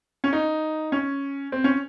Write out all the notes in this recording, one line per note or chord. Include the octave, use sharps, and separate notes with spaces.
C#4
D#4
C#4
C4
C#4